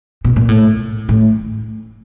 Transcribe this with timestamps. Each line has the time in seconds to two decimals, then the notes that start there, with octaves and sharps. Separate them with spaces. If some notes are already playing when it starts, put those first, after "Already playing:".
0.25 B2
0.36 A#2
0.49 A2
1.09 A2